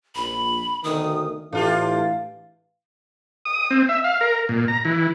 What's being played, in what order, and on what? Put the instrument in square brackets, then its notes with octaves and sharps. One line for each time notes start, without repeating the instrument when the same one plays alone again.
[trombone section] A#1 [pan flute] B5
[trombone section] D2 B2 D#3 [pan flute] D#6
[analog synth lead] A2 [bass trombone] E3 [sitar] D4 F4 G4 [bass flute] F5
[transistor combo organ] D#6
C4
E5
F5
A#4
A#2
A#5
E3